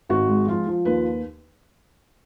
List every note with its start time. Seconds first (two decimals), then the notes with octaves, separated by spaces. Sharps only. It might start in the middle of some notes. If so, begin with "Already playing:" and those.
0.09 G#1 F#4
0.28 G#3
0.47 F3 F4
0.67 F3
0.85 D#2 B4